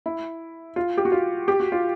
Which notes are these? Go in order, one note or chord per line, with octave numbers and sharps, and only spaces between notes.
E4
F4
G4
F#4
F4
G4
F#4
F4